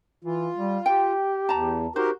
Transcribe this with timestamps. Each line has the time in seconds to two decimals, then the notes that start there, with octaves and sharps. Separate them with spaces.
0.24 E3 F4
0.55 G3
0.86 G4 G5
1.49 E2 A5 A#5
1.96 D#4 F#4 G4 A#4 C5